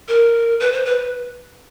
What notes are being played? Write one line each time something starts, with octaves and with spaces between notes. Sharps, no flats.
A#4
B4
C5
B4